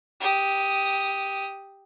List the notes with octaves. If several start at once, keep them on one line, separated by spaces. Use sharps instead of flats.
G4 D#6